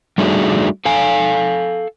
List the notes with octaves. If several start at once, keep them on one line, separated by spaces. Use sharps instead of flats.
G3 A3 D4 D#4 F#4 G#4
A4 F5 G#5